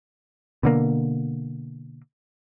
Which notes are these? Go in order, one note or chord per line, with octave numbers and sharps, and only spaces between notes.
B2 D3 A#3